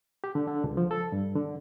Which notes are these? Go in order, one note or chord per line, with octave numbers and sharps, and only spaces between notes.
G4
D3
D3
C#2
F3
A4
G2
D3